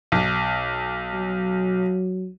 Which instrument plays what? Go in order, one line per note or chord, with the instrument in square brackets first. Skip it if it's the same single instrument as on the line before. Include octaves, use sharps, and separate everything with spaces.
[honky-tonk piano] B1
[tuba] F#3